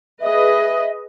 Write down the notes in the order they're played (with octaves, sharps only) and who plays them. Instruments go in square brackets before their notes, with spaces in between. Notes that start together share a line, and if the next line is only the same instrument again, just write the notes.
[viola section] G#4 B4 D#5 [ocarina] E5